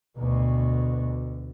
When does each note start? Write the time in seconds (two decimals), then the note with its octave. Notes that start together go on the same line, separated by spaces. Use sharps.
0.17 D2 B2